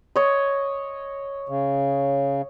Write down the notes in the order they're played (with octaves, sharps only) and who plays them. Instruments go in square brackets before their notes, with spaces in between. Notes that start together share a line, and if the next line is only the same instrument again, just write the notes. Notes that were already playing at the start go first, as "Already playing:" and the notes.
[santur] C#5 D#5
[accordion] C#3